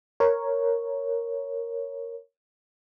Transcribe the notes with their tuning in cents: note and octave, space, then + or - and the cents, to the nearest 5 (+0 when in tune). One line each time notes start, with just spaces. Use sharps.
A#4 +0 C#5 +0